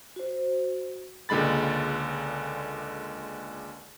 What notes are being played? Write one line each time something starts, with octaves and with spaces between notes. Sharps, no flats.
F#4 C5
C#2 A#2 D3 G#3 B5 A6